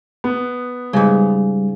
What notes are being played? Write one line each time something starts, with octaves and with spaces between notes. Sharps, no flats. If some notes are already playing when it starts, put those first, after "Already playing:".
B3
G#2 C#3 G3